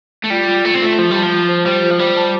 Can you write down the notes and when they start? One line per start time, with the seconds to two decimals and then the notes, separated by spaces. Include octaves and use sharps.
0.24 A3
0.30 G3 F4
0.47 F4
0.64 A3 F4
0.74 C4
0.81 A3 F4
0.98 F3 F4
1.11 G3 A5
1.24 F3
1.32 F4
1.48 C5
1.66 G3 C5
1.83 F4
1.90 F3
1.99 G3 C5
2.17 A5